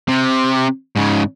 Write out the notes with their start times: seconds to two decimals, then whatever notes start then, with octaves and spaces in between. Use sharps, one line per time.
0.08 C3
0.96 G#2 C#3